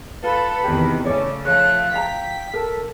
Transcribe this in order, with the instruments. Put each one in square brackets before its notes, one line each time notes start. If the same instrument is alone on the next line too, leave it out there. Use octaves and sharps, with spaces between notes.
[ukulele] F4 [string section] A4 [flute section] B4 B5
[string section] E2 C3 D#3 [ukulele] G4
[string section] C#3 A3 C#4 [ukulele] C#5 D5
[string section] F3 A3 [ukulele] C#5 [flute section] F5 F#6
[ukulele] F5 A#5 [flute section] G5 [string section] B6
[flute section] A4 [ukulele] A#4